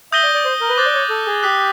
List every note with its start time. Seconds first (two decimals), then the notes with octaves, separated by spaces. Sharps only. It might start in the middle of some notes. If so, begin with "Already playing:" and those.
0.12 E5 D#6 G6 A#6 D#7 G7
0.23 D5
0.34 D5
0.45 C5
0.61 A#4
0.69 B4
0.77 C5 D6 F#6 A6
0.86 D5
0.94 C#5
1.10 A4
1.27 G#4
1.43 G4 D#6 F#6 B6